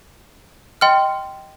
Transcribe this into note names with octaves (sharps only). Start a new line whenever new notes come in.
D#5 G5 C6 F6